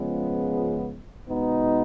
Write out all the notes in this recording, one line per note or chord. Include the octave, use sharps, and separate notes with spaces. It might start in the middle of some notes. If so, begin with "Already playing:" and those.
Already playing: C#2 C#3 F3 G#3 B3
B2 G#3 B3 D#4